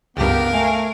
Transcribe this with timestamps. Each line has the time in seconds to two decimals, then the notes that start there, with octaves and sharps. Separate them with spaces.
0.17 C#2 G2 B3 G4 A#4 F5
0.53 A3 G#5